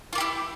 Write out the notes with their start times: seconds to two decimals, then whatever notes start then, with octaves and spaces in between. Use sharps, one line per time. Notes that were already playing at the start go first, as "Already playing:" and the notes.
0.13 F4
0.15 A#3
0.18 G4
0.21 E4